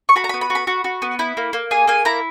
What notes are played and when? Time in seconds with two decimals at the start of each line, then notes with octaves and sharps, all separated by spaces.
0.09 C#6
0.16 F#4 B5
0.24 A#5
0.29 B5
0.34 B3
0.41 B5
0.50 F#4
0.55 B5
0.67 F#4
0.84 F#4
1.02 B3
1.19 E4
1.37 A#3
1.53 A#3
1.71 G#4 G#5
1.88 A#3 G#5
2.05 E4 A#5